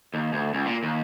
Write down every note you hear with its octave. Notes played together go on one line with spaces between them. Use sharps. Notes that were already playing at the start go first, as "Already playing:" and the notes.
D#2
D2
C#2
A#2
D#2